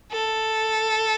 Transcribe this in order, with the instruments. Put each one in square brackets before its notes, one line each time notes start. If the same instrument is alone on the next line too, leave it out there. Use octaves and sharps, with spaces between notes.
[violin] A4